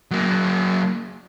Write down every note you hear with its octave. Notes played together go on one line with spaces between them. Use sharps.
F#3 A#3